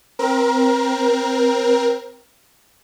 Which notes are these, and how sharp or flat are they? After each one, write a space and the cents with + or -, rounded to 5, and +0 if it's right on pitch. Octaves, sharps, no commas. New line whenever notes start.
C4 +0 A#4 +25